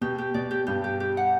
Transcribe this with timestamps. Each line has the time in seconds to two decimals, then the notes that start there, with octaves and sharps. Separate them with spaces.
0.01 B2 G4
0.18 G4
0.34 B2 D5
0.51 G4
0.67 G2 G4
0.84 G4
1.00 G4
1.17 F#5